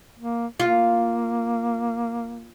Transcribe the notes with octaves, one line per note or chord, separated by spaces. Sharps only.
A#3
A#3 F4